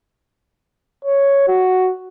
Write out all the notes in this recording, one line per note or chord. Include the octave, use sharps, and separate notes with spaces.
C#5
F#4